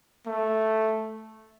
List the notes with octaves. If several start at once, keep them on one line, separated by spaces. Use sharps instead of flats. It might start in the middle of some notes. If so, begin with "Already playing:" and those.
A3